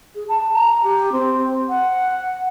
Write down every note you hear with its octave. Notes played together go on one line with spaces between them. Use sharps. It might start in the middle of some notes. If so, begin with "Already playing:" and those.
G#4
A5
A#5
G4
C4
F#5